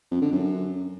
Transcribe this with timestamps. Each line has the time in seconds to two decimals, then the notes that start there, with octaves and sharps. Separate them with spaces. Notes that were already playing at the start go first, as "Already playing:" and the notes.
0.11 F2
0.22 D3
0.32 F#2